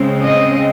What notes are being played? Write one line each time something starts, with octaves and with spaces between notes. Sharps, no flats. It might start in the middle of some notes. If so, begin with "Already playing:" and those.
Already playing: C#3 G#3 C4
D#5